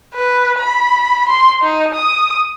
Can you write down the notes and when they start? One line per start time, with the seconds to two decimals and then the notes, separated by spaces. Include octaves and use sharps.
0.14 B4
0.59 B5
1.29 C6
1.62 D#4
1.94 D#6